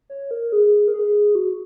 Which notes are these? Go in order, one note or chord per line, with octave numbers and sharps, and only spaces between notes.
C#5
A#4
G#4
A#4
G#4
F#4